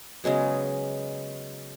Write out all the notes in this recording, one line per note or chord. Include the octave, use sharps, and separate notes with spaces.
C#3 F#3 G#3 B3